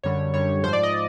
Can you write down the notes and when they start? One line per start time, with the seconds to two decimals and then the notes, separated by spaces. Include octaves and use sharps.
0.03 F#2 D3 G3 C#5
0.34 F#2 D3 G3 C#5
0.63 G#2 F3 C5
0.73 D5
0.83 D#5